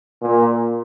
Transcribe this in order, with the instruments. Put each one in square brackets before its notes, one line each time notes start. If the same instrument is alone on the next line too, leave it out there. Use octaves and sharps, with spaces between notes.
[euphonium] A#2